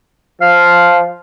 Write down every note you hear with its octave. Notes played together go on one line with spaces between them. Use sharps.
F3 F5